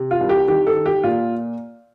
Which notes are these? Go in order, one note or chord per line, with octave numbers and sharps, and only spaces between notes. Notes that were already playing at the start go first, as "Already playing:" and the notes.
Already playing: C3
F4
C2
G4
D#3 G4
A4
D#3
G4
A#2 F4